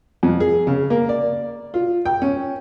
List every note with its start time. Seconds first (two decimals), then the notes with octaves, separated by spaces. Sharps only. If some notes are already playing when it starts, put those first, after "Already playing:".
0.23 F2
0.40 G#4
0.67 C#3
0.90 A#3
1.09 D5
1.74 F4
2.06 G5
2.22 C#4